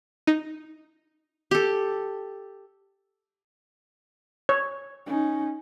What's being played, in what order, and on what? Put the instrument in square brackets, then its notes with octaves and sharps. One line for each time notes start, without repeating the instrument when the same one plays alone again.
[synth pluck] D#4
[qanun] G4 A4
[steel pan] C#5
[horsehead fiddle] C#4 D#4